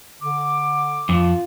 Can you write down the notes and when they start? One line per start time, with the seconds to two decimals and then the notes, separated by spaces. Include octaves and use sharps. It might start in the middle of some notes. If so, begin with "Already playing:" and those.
0.20 D3 D6
1.09 F2 F4